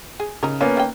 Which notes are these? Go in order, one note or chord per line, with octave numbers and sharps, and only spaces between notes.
G#4
C#3 D#4 A#4
A#3 B3 C#4 F4
D#3 G5